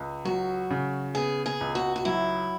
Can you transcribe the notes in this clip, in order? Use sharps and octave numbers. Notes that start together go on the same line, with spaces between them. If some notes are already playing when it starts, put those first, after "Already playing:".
Already playing: C#2
F#3 F#4
C#3
B3 G#4
G#4
C#2
F#4
F#4
F#3 E4